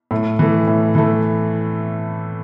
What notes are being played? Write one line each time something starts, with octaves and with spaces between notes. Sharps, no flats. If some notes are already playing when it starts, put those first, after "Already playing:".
A2
E3 A3
A2
E3 A3